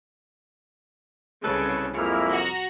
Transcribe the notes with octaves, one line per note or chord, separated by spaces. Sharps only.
C2 C#3 G#3 A4 B4
F2 G#3 A#3 E4 F6
F#4 A#5